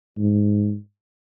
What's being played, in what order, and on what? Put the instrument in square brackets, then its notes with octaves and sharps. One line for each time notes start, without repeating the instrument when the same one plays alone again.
[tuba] G#2